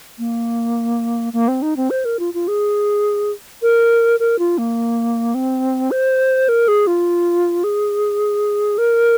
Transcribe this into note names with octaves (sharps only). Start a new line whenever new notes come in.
A#3
A#3
C4
D#4
C4
C5
A#4
F4
F4
G#4
A#4
A#4
F4
A#3
C4
C5
A#4
G#4
F4
G#4
A#4